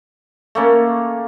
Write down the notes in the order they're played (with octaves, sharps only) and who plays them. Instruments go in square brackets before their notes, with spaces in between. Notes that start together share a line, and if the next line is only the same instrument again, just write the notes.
[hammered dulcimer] A3 A#3 C#4